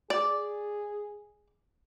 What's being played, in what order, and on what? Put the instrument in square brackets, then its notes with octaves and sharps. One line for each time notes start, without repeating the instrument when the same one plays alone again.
[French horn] G#4 [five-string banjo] D5